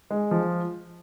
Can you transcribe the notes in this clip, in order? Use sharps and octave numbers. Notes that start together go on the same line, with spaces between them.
G#3
F3